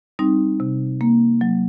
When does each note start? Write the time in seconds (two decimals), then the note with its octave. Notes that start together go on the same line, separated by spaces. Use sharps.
0.19 G3 C4 D#4
0.60 C3
1.01 A#3
1.41 F#3